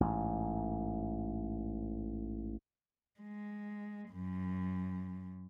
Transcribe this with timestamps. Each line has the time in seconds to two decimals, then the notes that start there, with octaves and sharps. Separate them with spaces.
0.01 A1 G#2
3.20 G#3
4.11 F#2